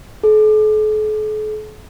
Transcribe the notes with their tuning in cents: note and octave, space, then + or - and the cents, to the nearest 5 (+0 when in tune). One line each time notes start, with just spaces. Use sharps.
A4 -45